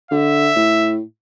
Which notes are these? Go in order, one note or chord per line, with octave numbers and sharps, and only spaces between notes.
D3 E5
A2